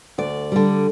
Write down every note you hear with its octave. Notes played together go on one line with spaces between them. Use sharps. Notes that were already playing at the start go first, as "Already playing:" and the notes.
D2 D5
D3 G3